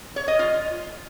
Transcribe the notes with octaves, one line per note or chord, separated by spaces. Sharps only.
C#5
D#5
F4